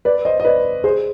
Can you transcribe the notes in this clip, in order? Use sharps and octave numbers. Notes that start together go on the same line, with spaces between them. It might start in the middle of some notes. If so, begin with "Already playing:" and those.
B4 D5
C5 D#5
D#5
B4 D5
G#4 C5